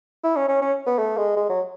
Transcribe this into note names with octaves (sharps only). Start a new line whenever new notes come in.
E4
C#4
C#4
C#4
B3
A3
G#3
G#3
F#3